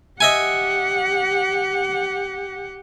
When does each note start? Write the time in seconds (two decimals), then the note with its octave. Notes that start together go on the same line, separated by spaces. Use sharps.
0.21 G4 D#5 E5 F#5 G#5